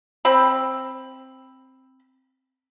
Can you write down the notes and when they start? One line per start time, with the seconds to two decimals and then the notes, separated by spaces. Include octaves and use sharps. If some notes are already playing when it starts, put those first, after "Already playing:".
0.25 C4 B5